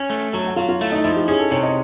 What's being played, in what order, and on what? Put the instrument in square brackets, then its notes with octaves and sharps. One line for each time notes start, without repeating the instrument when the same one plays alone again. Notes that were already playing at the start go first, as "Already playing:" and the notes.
Already playing: [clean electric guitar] C#4
A3
[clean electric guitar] F#3 [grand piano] A4
[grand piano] F#4
[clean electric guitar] F#3 [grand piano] F4
[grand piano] F4
[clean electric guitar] A3 [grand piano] E4
[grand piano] D#4
[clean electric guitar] F3 [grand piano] E4
[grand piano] G4
[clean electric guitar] C#4 [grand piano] G#4
[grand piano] A4
[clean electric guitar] C3 [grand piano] C#5
[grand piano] D#5